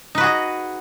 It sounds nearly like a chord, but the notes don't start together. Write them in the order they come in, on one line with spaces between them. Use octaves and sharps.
D#4 B4 F#4 G#4 D#5